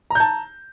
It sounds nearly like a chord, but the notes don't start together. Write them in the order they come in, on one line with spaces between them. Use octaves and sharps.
A#5 G6 A5